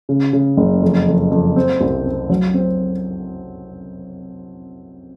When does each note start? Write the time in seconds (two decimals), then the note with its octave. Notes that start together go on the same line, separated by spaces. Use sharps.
0.09 C#3
0.33 C#3
0.57 F#1
0.82 F2
1.07 F2
1.31 F2
1.56 C4
1.81 C2
2.06 C4
2.30 F#3
2.54 C4